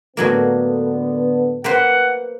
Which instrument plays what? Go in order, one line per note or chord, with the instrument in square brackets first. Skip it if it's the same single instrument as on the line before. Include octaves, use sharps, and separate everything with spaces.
[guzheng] A2 F#3 A#3 [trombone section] D3 B3
[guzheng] A#3 B4 C5 [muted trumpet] F#5